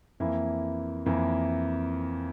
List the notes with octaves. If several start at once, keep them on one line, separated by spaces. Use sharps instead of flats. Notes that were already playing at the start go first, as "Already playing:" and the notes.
F2 E3 A#3 E4
F2 E3 A#3 E4